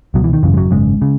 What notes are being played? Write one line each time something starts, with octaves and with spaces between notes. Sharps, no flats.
C#2 B2 F#3
E3
D#3
G#1 F#2 C#3 E3
G#3
F#3
G#1 F#2 C#3 G#3
C#3